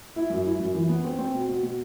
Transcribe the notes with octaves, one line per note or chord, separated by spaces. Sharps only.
E4
F#2
E4
F#2
E3
B3
C4
C4
B2
B2
B2